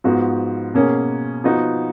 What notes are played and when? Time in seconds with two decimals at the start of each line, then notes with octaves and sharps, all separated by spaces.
0.04 G#2 F3 B3 F#4
0.74 B2 A#3 C#4 G#4
1.44 F3 B3 D#4 F#4